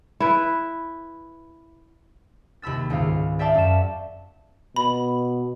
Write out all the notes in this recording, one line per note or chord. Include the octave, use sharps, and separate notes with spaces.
E4 B4
D#2 C3 B5 E6 A6
C#2 G#2 D#3 F5
D5 E5 F5 G5 A5 D6
F#2 E7
B2 B5